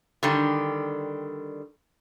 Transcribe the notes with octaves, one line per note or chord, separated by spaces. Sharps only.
D3 D#3 G3